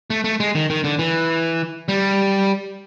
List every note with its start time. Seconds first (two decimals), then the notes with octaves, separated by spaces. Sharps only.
0.10 A3
0.24 A3
0.40 G#3
0.55 D#3
0.70 D#3
0.84 D3
0.99 E3
1.89 G3